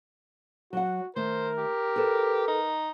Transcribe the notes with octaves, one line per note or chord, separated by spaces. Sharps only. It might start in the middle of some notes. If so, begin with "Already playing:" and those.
F#3 F#4 F#5
D#3 A3 A#4 C5
G4
A4 B4
D#4